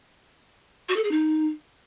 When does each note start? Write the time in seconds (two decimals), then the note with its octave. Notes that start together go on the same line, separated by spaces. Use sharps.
0.89 F#4
0.96 A4
1.04 G#4
1.11 D#4